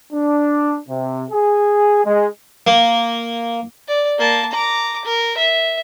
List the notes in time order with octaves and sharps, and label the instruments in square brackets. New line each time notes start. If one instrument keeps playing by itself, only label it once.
[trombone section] D4
C3
G#4
G#3
[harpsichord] A#3
[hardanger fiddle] D5
A#3 A5
A#5 D6
A#4
E5